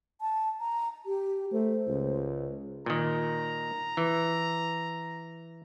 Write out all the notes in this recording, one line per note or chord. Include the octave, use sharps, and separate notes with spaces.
A5
A#5
G4
A3 C5
C#2
A#2 D#3 A#5
E3